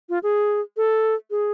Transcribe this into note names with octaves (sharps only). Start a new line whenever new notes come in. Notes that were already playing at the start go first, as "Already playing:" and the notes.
F4
G#4
A4
G#4